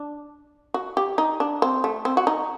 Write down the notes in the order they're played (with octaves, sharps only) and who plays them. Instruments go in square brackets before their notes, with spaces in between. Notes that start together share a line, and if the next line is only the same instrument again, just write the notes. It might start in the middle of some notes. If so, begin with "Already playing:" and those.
Already playing: [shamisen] D4
F#4
G4
D#4
D4
C4
A3
C4
F#4
D#4